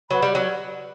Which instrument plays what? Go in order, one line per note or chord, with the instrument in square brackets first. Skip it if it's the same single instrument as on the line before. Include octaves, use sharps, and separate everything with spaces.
[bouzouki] F#3 [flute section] B4 F#5 B5
[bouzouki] G3
F#3